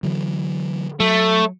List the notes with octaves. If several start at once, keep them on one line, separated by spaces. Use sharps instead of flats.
D3 E3 F#3
F#3 A3